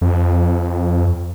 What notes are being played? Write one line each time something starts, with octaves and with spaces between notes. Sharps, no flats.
F2